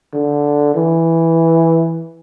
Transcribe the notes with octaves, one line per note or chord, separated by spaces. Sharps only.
D3
E3